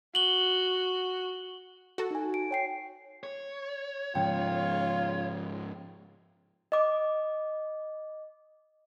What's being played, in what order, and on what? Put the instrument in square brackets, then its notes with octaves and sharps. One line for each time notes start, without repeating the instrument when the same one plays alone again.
[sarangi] F#4 [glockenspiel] F#7 G7
[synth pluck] F#4 A4
[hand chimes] D#4 G#5
D7
C#5 G5 C7
[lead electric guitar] C#5
[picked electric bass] G#2 C#3 F3 [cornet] F4 [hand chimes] G5
[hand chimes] D#5 D6